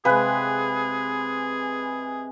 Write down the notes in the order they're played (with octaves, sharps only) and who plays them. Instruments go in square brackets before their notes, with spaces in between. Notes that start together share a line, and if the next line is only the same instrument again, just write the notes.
[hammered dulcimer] C3 G#3 [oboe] G#4 [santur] B4 [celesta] F5 G#5 F#6